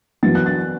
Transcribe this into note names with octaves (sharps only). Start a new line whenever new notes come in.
F#2 E3 B3 A6
F#6
A6